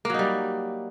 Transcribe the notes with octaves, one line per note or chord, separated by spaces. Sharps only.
F#3 G3 A#3 D#4